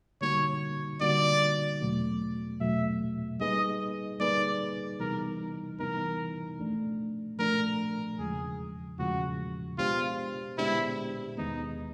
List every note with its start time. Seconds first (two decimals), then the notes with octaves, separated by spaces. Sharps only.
0.21 D3 G3 A#3 D#4 F#4 C#5
1.01 D3 G3 A#3 D#4 F#4 D5
1.81 E2 B2 F#3 A3
2.60 E2 B2 F#3 A3 E5
3.40 G3 A#3 D#4 G#4 B4 D#5
4.20 G3 A#3 D#4 G#4 B4 D5
5.00 C3 E3 G3 B3 D#4 A#4
5.79 C3 E3 G3 B3 D#4 A#4
6.59 F3 A3 D4
7.39 F3 A3 D4 A#4
8.18 E2 C#3 F3 G#3 G#4
8.98 E2 C#3 F3 G#3 F#4
9.78 G#3 B3 D4 F4 G4 C5
10.58 G#3 B3 D4 E4 G4 C5
11.38 D#2 D#3 G#3 B3 D#4